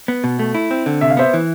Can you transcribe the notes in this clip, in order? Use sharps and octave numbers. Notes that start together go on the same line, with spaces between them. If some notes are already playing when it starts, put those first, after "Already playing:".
B3
B2
A3
E4
C4
D3
C3 E5
F5
B3 C5 E5
E3